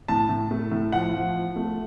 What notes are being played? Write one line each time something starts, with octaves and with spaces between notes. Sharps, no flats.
A2 A5
A2
A3
A2
F3 F#5
F3
F3
A3